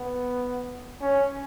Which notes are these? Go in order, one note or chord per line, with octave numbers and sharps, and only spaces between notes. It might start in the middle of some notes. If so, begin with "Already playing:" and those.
Already playing: B3
C#4